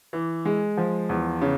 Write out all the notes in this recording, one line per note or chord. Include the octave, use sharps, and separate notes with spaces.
E3
G#3
F3
E2
C#3